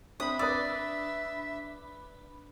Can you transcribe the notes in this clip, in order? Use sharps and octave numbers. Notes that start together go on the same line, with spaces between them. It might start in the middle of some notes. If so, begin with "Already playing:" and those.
C4 D4 E5 B5 D#6
B4 D5 D#6 E6